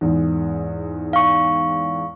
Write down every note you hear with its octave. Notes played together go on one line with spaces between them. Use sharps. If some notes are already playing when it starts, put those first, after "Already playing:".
E2 G#2
F5 C#6